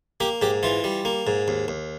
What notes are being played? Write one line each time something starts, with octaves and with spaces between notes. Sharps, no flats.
A#3 G4
G#2 G4
E3 F4
G3
A#3
G#2
D#2
D#2